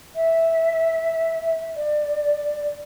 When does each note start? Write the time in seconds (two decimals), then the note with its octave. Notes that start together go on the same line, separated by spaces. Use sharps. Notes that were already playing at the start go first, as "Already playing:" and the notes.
0.16 E5
1.76 D5